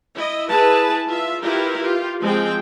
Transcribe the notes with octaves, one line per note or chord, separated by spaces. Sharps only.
E4 D#5
E4 G#4 B4 A5
F4 E5
E4 F4 G4 A#4 B4
F4 G4
F3 G#3 C4 G5